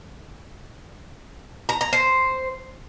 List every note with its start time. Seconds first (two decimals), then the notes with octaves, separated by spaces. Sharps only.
1.69 A#5
1.81 A#5
1.93 C5